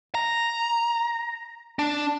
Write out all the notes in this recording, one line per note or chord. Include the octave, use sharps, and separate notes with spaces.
A#5
D4